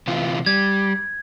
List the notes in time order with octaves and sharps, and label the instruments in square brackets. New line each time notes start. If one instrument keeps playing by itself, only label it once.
[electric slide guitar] C3 E3 F4
[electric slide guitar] G3 [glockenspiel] G#6